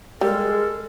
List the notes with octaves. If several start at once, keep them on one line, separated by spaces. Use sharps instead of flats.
G3 G#3 A4 A#4